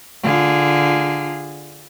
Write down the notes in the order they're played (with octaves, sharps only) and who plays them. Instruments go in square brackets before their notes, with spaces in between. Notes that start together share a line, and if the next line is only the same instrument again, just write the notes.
[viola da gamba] D3 F4 G#4